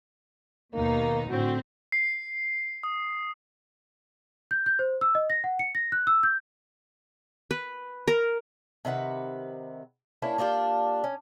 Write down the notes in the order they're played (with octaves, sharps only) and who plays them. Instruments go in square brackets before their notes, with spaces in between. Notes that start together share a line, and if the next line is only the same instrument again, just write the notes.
[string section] D#2 B2 D#4 [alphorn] A#3
[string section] A2 D3 C4 [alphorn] F#4
[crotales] C7
D#6
[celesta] G6
G6
C5
E6
D#5
A#6
F#5
C#7
A#6
F#6
E6
G6
[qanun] B4
A#4
[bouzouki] C3 D#3 B4 F#5
A#3 C#4 D4 E4
A#3 D4 F4 G4
C#4